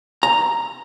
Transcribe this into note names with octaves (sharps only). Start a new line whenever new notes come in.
A#5